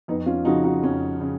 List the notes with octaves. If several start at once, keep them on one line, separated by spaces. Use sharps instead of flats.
F2 B3 D#4
C#4 F4
C#3 F3 D#4 F#4
D#4 F#4
F2 C#4
C#3